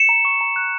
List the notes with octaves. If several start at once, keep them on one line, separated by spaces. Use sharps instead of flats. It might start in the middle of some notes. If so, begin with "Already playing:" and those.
Already playing: C#7 E7
A#5
C#6
A#5
F#6